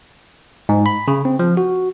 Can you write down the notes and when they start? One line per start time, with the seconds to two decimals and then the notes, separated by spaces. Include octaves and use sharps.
0.69 G#2
0.86 B5
1.08 C#3
1.25 C4
1.39 F3
1.57 F#4